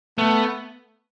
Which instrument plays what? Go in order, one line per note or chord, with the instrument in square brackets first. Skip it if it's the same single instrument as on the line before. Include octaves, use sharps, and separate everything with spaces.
[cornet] A3 [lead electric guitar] B3